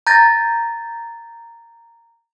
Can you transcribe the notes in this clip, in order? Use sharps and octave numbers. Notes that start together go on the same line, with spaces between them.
A#5 G6 A6 A#6